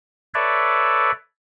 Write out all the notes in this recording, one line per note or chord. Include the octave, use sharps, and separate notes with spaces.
A4 B4 C#5 D5 E5